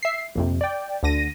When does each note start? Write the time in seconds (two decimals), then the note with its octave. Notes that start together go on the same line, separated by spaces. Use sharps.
0.03 E5 C7
0.35 A#1 F2 C3
0.61 D5 G5
1.03 D2 D3 A#6 D#7